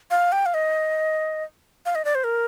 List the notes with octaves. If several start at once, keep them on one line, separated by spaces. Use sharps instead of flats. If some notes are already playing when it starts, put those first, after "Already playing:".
F5
G5
F5
D#5
F5
D#5
D5
C5
A#4